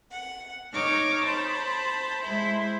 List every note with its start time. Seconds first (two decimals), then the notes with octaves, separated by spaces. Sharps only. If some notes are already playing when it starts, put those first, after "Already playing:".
0.11 F#5
0.72 D#4 C#5 D6 F6
1.24 C5 A5 B5
2.22 G#3 E4 C5 B5